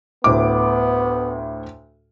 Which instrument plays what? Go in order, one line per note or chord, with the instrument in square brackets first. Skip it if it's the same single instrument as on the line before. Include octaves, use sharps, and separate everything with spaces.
[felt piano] D2 A2 D6 [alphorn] B3